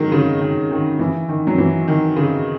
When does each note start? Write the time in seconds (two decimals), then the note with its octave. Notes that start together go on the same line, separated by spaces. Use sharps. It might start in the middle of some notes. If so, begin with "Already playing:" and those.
Already playing: D#3 F#3 G#3
0.12 C#3
0.41 D#3
0.71 D#3
0.99 E3
1.29 D#3
1.47 F#3
1.58 E3
1.88 D#3
2.16 C#3